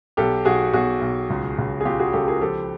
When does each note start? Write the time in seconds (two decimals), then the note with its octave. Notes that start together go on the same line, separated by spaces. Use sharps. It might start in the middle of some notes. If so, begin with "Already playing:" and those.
0.17 B1 G4 A4
0.45 B1 F#4 G#4
0.73 B1 F#4 G#4
1.01 B1
1.30 C#2
1.58 C#2
1.81 G#4
1.85 C#3 F4 G4
1.99 F#4 G#4
2.13 C#2 G4 A4
2.27 G#4 A#4
2.41 F3 G4 A4